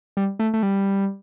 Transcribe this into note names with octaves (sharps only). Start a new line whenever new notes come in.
G3
A3
A3
G3